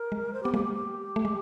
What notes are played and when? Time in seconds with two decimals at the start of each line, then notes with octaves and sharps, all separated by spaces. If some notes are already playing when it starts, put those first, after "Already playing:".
Already playing: A#4
0.12 G#3
0.34 C5
0.43 B3 G4
0.54 G#3 A#3 G4
0.64 G4
0.74 G4
1.16 A3
1.25 G#3